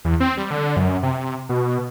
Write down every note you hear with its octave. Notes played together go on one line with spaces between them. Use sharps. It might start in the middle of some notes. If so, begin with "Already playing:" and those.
E2
C4
G3
D3
F#2
C3
B2